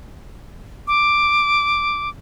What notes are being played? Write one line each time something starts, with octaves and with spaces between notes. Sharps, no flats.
D6